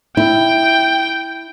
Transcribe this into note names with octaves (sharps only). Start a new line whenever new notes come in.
E4 G5